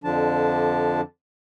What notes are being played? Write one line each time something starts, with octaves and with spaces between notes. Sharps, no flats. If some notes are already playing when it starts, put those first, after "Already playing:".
F2 D3 F3 D4 A5